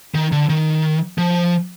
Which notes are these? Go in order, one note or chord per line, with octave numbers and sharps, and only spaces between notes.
D#3
D3
D#3
F3